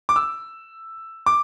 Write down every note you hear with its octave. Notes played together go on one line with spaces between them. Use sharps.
D6
E6
D6